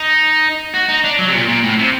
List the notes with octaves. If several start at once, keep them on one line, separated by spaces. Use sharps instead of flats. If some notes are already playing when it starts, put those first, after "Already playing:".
Already playing: D#4
F#4
D#4
D4
F#3
C3
A#2
A#2
A2
C3